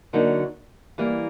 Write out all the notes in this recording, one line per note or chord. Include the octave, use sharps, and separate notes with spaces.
D3 F#3 A#3 D#4
E3 G3 A#3